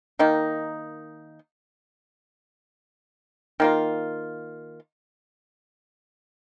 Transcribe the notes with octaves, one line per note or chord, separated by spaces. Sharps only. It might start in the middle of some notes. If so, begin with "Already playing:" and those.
D#3 A#3 D#4
D#3 A#3 F4